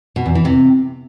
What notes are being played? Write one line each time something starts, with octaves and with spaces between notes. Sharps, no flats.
B2
E2
E3
C3